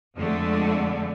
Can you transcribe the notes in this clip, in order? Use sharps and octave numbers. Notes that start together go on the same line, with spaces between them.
F2 D3 G#3 A3